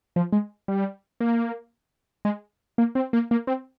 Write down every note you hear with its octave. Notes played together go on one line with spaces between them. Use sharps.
F3
G#3
G3
A#3
G#3
A#3
C4
A#3
A#3
C4